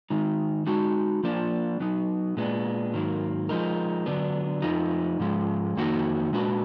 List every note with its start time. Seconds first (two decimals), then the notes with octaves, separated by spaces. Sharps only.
0.10 D#3 G#3 D#4
0.66 G#3 D#4 F#4
1.23 F3 A#3 D4
1.80 F#3 B3 D#4
2.37 A#2 G#3 B3 D4
2.93 G#2 D#3 F#3 A#3
3.49 F3 G#3 D#4 A#4
4.06 D3 F#3 B3 D4
4.62 F2 F3 D#4
5.20 G#2 F3 G#3
5.76 F2 D#3 A#3 D#4 F#4
6.33 A#2 G#3 D4 F#4 B4